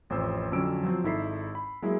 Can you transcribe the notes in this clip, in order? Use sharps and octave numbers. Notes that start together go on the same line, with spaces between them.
A1 F2 C5 E6
F2 D3 F#3 C#4 E6 D7
F3 F#3 C4
G#1 D#4 E4 A4 B6 C7
B5
F#3 G#3 A#3 E4